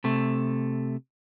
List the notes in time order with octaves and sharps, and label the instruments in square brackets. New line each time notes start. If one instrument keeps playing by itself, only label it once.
[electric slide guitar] C3 A3